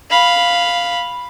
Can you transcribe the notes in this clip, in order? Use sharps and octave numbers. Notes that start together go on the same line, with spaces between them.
F5 B5